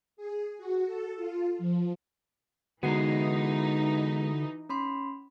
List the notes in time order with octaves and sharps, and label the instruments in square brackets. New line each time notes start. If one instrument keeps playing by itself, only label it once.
[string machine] G#4
F#4
A4
F4
F3
[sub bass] D3 [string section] E3 D#4 [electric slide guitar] G#3 B3 [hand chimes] F#4 F#5 C7
[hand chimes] C#4 B5 C6